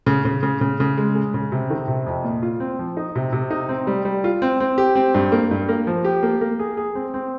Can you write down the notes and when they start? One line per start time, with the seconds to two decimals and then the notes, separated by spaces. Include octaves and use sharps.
0.06 C#3
0.25 C#3
0.43 C#3
0.61 C#3
0.80 C#3
0.97 G#3
1.15 G#3
1.34 C#3
1.52 C3
1.70 D#3
1.88 C3
2.06 F2
2.24 A#2
2.43 F4
2.60 C4
2.79 F3
2.97 D#4
3.16 C3
3.33 C3
3.51 D#4
3.69 C4
3.87 G3
4.05 G3
4.24 F4
4.42 C4
4.60 C4
4.78 G4
4.95 C4
5.15 G2
5.32 A#3
5.51 G2
5.69 A#3
5.87 F3
6.05 G4
6.23 A#3
6.41 A#3
6.59 G#4
6.77 G#4
6.95 C4
7.14 C4